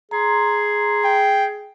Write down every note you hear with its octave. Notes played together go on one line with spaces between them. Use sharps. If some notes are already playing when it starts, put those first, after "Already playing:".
G#4 A#5 C6
G5